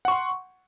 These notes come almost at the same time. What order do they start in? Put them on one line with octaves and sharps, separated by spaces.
F#5 C#6 C6